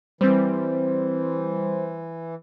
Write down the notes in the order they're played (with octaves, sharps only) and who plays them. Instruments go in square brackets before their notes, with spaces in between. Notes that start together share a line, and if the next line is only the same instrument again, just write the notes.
[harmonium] E3 [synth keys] G3 C4 [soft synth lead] C5